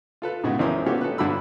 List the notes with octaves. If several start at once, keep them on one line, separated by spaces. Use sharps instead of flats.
F4 A4 B4
A2 C#3 G#3 B3 F#4
A1 C#4 E4 A#4 C5 D#6
A#3 B3 C#4 F#4 G4 A4
A4 B4
G2 D3 F#3 D4 B5 E6